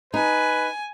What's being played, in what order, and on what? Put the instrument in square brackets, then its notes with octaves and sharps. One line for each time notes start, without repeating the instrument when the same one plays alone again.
[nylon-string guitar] D#4 [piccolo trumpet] B4 [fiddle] G#5